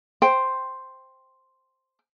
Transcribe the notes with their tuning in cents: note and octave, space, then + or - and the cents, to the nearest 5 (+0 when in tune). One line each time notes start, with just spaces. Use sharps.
C5 +0 G5 +0